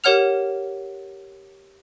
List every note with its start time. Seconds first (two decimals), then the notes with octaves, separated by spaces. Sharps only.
0.04 G4 A#4 C#5 F#5 F6 F7